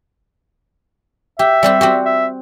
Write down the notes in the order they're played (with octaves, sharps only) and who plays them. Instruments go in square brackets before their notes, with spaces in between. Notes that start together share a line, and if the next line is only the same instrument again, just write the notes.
[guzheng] G4 [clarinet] E5
[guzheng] G3 C4 G4
C4 F#4 G4
[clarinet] E5